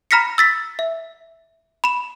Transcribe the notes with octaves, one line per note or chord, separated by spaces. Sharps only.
A#5 B5 F6 A#6 B6 C#7
E6 A6 B6
E5
B5 E7